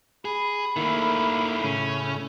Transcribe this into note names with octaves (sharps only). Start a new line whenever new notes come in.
G#4 B5
D#3 A3 A#3 E4
A2 C#3 C#4